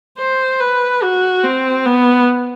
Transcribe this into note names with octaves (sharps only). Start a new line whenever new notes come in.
C5
B4
F#4
C4
B3